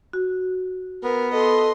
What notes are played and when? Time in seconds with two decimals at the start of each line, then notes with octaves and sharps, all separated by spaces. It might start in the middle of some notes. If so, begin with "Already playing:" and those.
0.13 F#4
1.04 B3 A#4
1.34 A4 D#5 C6